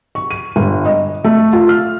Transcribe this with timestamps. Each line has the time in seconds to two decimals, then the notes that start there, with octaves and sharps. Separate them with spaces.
0.15 C#6
0.31 D#7
0.56 G1
0.86 D#5
1.24 A3
1.53 F4
1.69 F6